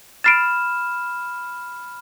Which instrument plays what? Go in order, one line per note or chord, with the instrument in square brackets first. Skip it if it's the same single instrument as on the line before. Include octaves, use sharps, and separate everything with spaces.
[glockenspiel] B5 F6 E7 [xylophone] A6 C7 D7